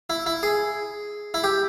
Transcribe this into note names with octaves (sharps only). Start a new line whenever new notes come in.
E4
E4
G#4
E4
G4